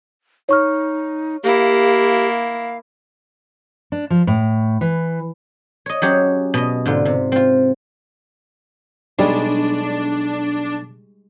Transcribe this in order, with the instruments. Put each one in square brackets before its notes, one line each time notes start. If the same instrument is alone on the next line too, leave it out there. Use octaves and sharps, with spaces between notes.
[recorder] D#4 [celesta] C#5 C#6 F6
[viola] A#3 E4 [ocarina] G4 [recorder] F5
[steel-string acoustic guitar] D4
F3
A2
E3
[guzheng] C#5 D#5
F#3 C#4 G4 G#4 C#5
B2 D#5
G#2 D3 F4
C3
C4 F4
[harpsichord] B1 [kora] G3 G#3 [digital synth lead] D4